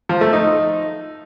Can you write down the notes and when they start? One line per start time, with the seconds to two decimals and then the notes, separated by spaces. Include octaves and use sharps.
0.09 F3
0.21 A3
0.33 D#4